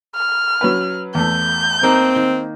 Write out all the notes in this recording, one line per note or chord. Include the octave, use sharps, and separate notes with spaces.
F6
F#3 C#4 B4
E2 A3 G6
A#3 C4 D#4 A#4
D#3